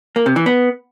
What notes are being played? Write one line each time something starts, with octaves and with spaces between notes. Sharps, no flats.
A#3
C3
E3
B3